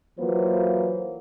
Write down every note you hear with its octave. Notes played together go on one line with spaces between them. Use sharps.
E3 F#3 A#3 F4 B4 C5